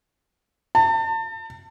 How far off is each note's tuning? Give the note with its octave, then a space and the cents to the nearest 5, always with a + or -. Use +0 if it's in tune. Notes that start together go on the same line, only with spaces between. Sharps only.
A5 +35